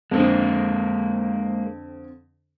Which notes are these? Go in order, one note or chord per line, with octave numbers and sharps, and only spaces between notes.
F2 D3 G#3 A#3 C4